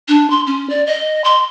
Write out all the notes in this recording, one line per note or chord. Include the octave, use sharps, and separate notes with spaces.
D4
C6
C#4
D5
D#5
C6